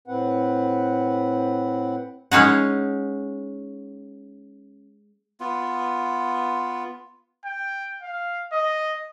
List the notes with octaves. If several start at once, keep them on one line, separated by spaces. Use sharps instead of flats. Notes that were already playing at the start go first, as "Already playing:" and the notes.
A2 C4 B4 F#5
G#3 C#4 D#4 F#5
B3 F4
G5
F5
D#5